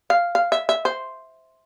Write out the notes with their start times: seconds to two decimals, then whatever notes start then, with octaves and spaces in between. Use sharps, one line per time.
0.10 F5
0.35 F5
0.52 E5
0.69 E5
0.85 C5